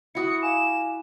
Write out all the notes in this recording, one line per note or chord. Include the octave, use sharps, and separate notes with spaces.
E4 F#4 E5 D#6 C#7
F5 G#5 D6 E7